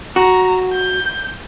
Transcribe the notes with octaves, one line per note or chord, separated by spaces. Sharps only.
F#4 A#5
G6